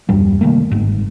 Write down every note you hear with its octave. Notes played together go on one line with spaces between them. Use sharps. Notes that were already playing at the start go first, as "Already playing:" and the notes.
A#1 E2 G2 G3
C3 D#3 A3 A#3
G1 G#2